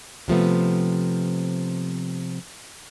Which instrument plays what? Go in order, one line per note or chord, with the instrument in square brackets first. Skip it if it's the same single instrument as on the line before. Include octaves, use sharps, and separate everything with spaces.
[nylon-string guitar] C3 F3 A3 B3